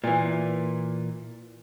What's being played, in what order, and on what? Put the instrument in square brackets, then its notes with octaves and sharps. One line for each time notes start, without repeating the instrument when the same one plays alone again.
[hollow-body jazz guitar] A#2 E3